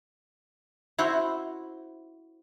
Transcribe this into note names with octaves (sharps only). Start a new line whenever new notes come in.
E4 F#4 C5